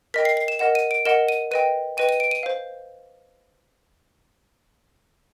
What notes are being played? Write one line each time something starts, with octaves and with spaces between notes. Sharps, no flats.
A#4 D#5 G5 B6
C7
C7
E7
A#4 D#5 F#5 E7
D#7
D7
A#4 D#5 F#5 E7
D#7
B4 D#5 G5 D#7
B4 D#5 G5 D#7
D#7
D7
D#7
C5 F5